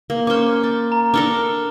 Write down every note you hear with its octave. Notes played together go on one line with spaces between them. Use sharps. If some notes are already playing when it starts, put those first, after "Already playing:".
A#3
C#4 C5 D6 F6
D5
A#5
D4 A4 A#4 D6 F6 G7